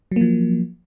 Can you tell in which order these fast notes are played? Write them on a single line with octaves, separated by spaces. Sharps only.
F#3 A#3 F3